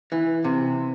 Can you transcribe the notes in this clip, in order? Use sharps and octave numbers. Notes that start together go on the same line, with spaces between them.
E3
C3